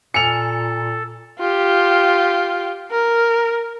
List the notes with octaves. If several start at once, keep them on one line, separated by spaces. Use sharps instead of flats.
A#2 A4 G#5 E6 F6 C#7 F7
F4 G4
A#4